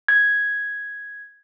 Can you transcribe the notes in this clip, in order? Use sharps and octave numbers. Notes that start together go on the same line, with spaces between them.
G#6